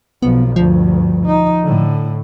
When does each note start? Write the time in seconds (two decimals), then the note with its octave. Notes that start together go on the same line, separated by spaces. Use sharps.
0.22 B1 F3 B3
0.56 D2 G2 F3
1.26 D#4
1.63 A2 D3